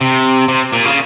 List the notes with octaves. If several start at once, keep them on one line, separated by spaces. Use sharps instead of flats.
C3
C3
A#2
C#3